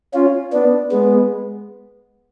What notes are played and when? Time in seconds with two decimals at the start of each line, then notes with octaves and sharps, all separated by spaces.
0.14 C#4 F4
0.53 B3 D4
0.92 G#3 B3